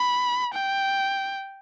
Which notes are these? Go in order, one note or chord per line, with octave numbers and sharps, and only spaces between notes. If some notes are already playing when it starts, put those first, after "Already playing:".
Already playing: B5
G5